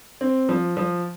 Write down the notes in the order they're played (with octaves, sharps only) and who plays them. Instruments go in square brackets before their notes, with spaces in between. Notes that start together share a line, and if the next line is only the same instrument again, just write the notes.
[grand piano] C4
F3
F3